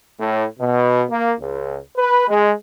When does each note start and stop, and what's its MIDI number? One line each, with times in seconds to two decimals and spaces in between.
0.19 0.45 45
0.59 1.03 47
1.09 1.33 58
1.39 1.78 37
1.97 2.28 71
2.28 2.49 56